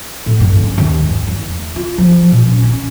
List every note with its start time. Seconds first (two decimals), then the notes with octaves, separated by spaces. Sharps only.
0.26 A2
0.40 G2
0.56 C#3
0.78 D#2
1.03 G#2
1.28 E2
1.49 A3
1.76 F4
1.98 F3
2.31 A#2
2.47 C#4
2.63 C#4